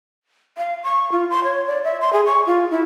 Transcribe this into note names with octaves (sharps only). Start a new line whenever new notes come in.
F5
C#6
F4
C6
C#5
D5
E5
C6
G#4
C#6
F4
E4